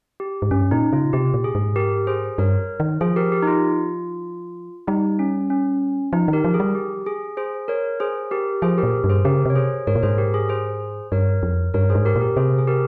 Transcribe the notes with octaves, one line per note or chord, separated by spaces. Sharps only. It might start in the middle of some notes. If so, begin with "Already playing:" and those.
G4
G#2
G2 C#4
A#2 D#4
C#3 F4
C3 G4
A#2
G#4
G#2
G4 A#4
G#4 C5
G2 A#4 C#5
D#3
F3 G#4 C5
G4 A#4
G4
D#4
F4
G3 D#4
C#4
C#4
F3 D#4
D#3
G4 A#4
F3
G#4
G3
G4
G#4
G#4 C5
A#4 C#5
G#4 C5
G4 A#4
F3 G#4 C5
G4 A#4
A#2
G2
G#4 C5
C#3 G4 A#4
C3 C#5
G#4 C5
G#2 A#4 C#5
A#2
G#2 G#4 C5
G4 A#4
G#4
G#4 C5
G2 A#4 C#5
F2
G2 A#4 C#5
G#4 C5
G#2
G4 A#4
A#2
G4 A#4
C3 G#4 C5
G#4
G4 A#4